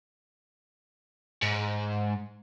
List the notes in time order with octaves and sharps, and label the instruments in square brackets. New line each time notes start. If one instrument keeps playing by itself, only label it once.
[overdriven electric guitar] G#2